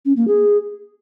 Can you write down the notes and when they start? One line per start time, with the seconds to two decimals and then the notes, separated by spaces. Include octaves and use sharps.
0.05 C#4
0.16 A#3
0.28 G#4